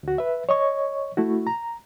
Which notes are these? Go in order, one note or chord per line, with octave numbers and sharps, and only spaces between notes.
D2 F#4
B4 E5
C#5 D#5 C#6
A3 E4 F#4
A#5